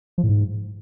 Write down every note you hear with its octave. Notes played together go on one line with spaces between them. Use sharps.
F3
A2
G#2